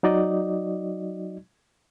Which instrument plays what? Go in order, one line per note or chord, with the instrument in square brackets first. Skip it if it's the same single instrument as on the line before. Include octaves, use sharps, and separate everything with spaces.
[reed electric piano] F#3 D#4 F#4 D5 D#5